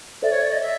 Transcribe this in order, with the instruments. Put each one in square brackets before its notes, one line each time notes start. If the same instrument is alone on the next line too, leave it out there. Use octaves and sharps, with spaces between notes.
[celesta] A4 C5 E5 [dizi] D5
[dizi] C#5
D5
D#5
E5